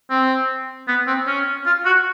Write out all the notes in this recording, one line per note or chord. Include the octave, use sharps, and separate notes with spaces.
C4
B3
C4
C#4
F4
F#4